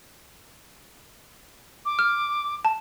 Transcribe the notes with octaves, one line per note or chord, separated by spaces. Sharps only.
D6
F6
A5